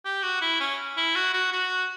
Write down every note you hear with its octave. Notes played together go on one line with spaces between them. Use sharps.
G4
F#4
E4
C#4
E4
F#4
F#4
F#4